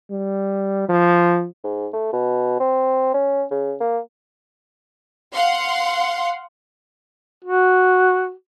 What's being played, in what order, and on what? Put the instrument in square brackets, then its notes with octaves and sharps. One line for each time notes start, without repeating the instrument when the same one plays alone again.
[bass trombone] G3
F3
[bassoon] G#2
A3
B2
C4
C#4
C#3
A#3
[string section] F5 F#5 C6
[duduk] F#4